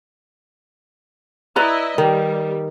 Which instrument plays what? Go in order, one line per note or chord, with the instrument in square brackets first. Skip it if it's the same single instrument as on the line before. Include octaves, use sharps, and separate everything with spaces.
[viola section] E4 D#5 [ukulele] B4 D5 A#5
[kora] D#3 [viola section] G3